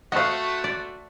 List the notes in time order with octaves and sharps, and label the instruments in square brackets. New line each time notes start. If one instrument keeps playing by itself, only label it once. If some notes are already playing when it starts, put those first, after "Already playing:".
[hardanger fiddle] A3 F#4 [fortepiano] C5 F#5 [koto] D#5 F5
[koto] D5